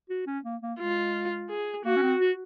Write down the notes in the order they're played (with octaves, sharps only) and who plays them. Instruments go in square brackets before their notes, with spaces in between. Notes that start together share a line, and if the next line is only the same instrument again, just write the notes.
[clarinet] F#4
C#4
A#3
A#3
[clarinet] G#3 [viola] F4
[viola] G#4
[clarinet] A#3 [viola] F#4
[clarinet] C#4
C4
F#4